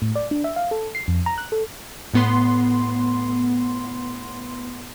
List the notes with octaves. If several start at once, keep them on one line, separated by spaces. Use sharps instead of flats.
A2
D5
D4
E5
F5
A4
C7
F2
A#5
F#6
A4
A2 B3 C6